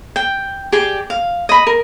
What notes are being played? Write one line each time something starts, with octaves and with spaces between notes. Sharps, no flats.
G5
G4 G#4 D5 G5
F5
D#5 B5
A#4